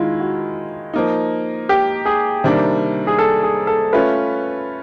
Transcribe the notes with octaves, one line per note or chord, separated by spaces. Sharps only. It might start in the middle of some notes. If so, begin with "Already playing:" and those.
Already playing: D#3 G#3 E4 F4
F#4
F3 A#3 D#4
G4
G#4
C3 D#3 G3 A#3 D4
G#4
A4
G#4
A4
A3 C#4 F4 B4